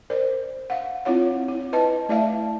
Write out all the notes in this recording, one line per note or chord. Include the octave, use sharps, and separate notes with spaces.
A#4 C5 D5
F5 F#5
C4 E4 F4 C#5 F#5
E4
B4 D#5 A5
A3 E4 D5 E5 F5 A5